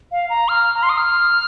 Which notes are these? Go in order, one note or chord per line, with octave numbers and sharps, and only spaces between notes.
F5
A#5
F6
A#5
C6
D#6
F6